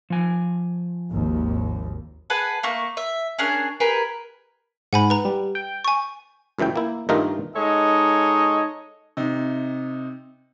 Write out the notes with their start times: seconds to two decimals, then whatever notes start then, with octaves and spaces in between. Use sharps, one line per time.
0.10 F3 G#5
1.11 G#1 D#2
2.30 G#4 B4 F#5 A5
2.63 A3 A#3 C#6
2.97 E5
3.38 C#4 D4 G#4 A#4
3.80 G4 G#4 A#4 B4
4.93 G#2 F#5 G#5 B5
5.10 B4 A#5
5.25 G3
5.55 G5
5.85 G#5 C#6
6.59 C#2 F#2 E3 A3 G5
6.76 A#3 E4
7.09 G2 D#3 A3 D#4 F4 A#4
7.56 G#3 D#4 A4 C#5 D#5
9.17 C3 D#4